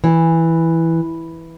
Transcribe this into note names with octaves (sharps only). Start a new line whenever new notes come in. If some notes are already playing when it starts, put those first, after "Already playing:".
E3